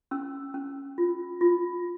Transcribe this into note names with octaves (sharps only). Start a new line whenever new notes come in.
C#4 E6
C#4
F4
F4